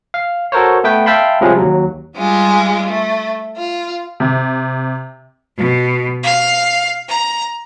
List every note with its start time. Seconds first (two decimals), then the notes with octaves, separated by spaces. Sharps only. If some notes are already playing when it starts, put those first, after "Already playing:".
0.14 F5
0.52 F#4 A4 A#4 C5 C#5
0.84 A3 B3 B4 G5
1.06 E5 F5 G5 A5 B5 C6
1.41 C3 F3 G3 G#3 C#4
1.59 D#2 F#3
2.16 G3 G#3 F4
2.88 A3
3.55 F4
4.20 C3
5.56 B2
6.23 F5
7.09 A#5